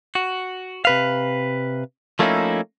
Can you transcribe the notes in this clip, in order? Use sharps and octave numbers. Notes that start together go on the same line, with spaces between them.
F#4
C3 B4 F5
F3 A3 A#3 C#4 D#4 E4